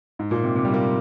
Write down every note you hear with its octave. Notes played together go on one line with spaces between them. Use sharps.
G#2
A#2
C3
C3
G3
A#3